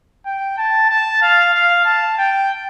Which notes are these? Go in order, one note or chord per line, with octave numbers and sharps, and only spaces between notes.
G5
A5
A5
F5
F5
A5
G5